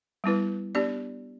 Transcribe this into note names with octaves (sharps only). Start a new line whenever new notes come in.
G3 B3 E4 B4
B3 D4 G4 D5